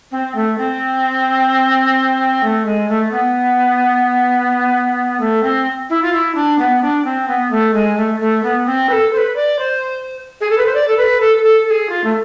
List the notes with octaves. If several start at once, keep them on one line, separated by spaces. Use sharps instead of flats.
C4
A3
C4
A3
G#3
A3
B3
A3
C4
E4
F4
E4
D4
B3
D4
C4
B3
A3
G#3
A3
A3
B3
C4
B4
A4
C5
B4
D5
C5
G#4
A4
B4
C5
D5
A4
B4
A4
A4
A4
G#4
F4
A3